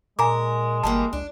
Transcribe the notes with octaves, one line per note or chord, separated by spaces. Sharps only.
A#2 G#3 A#4 G#5 A#5 D6
G1 E3 G3 A#3 A5
C#2 D4